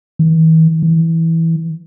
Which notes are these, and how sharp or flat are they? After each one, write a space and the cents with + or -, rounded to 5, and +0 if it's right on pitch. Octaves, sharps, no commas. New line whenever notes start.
E3 -45
E3 -10